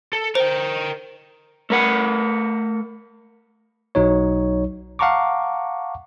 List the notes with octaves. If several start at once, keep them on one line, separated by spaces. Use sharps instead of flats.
A4
A#4 C5 G5
A3 A#4 F#5
B1 F#3 D#4 C#5
F5 F#5 A5 A#5 C#6 D6